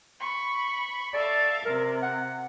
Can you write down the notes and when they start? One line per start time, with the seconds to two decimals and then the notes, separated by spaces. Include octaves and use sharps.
0.20 B5 C#6
1.14 A4 D5 E5 F5
1.65 C3 A#4
2.03 F#5